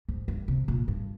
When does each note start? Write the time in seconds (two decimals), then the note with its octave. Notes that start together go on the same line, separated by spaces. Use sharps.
0.09 G#2
0.28 G2
0.48 C3
0.68 A#2
0.88 G2